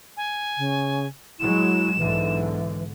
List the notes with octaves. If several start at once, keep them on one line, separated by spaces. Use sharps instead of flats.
G#5
C#3
F#3 G#3 E4 E7
B1 G#2 D3 E3